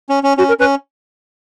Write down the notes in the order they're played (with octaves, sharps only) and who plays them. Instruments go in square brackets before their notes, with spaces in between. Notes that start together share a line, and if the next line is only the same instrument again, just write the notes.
[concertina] C#4
C#4
[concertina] C#4 [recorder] F#4
[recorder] A#4
[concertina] C#4 [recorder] B4